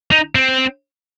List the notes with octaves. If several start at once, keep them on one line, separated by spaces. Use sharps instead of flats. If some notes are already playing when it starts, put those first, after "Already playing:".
D#4
C4